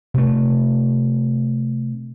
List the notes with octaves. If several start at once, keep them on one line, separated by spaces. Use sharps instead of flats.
C3 A3